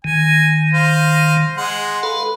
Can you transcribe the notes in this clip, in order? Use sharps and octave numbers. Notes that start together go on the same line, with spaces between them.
D#3 G#5
C5 F5
G#3 F#5 C6
A4 B4 F5